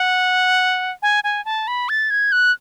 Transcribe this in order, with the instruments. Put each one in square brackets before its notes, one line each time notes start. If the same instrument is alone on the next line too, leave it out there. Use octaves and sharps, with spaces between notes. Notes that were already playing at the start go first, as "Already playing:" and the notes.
Already playing: [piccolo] F#5
G#5
G#5
A5
B5
A6
G#6
F#6